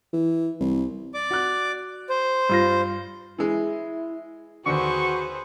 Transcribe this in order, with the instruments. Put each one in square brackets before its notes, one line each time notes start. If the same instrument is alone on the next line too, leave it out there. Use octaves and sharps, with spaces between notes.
[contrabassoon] E3
C2
[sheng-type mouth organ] D5 D6
[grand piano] F#4 F#6
[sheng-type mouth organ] C5
[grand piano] G2 F4 A#6
[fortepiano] E3 G#3 [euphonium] E4
[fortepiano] D#2 D3 [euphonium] F#4 [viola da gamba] G#4 B4 C5 [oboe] C#6